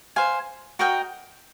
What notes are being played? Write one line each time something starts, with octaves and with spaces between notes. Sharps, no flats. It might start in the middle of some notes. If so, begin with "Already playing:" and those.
C5 F5 G#5
F#4 A#4 D#5 G5